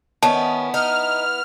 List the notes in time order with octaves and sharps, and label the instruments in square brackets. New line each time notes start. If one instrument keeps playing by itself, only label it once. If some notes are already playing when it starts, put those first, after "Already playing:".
[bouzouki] D#3 C#4 [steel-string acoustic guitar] B3 E4 [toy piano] A5
[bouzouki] D#4 [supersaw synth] F6